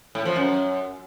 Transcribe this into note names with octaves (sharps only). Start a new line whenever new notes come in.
A2
F3
F#2